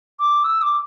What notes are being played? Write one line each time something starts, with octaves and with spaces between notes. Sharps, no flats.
D6
E6
D6